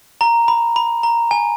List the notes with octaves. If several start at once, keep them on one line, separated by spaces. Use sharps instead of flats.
A#5
B5
B5
A#5
G#5